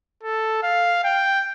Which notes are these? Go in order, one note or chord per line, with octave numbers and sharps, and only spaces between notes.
A4
F5
G5